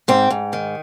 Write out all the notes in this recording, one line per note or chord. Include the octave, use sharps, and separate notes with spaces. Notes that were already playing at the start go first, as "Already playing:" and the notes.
G#2 C4
G#2
D#3